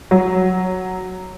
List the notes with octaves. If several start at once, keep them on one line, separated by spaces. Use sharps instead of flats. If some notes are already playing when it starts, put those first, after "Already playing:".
F#3